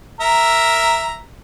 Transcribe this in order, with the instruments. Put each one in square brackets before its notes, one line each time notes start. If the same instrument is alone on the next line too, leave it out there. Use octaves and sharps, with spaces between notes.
[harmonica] A#4 E5 A#5